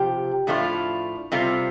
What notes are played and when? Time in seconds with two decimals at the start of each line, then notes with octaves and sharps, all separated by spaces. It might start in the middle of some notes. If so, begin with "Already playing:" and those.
Already playing: C3 F3 G4
0.47 A2 F3 A3 D4 F4
1.32 C3 G3 C4 F4 A4